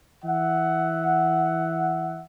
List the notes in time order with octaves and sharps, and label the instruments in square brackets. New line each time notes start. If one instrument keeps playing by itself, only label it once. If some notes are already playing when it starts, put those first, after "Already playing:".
[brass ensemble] E3 E5 F#5